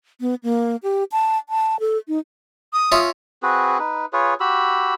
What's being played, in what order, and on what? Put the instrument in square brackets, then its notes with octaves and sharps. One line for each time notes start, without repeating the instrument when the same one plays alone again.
[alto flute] B3
A#3
G4
A5
A5
A4
D#4
[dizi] D#6
[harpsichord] C#4 F4 E5
[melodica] C4 F#4 G#4 B4
D#4 B4
F4 G#4 B4 C#5
F#4 G4 B5 E6